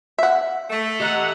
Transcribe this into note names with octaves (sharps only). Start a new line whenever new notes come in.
E5 F#5
A3
G4 D#5 E5 F#5 A#5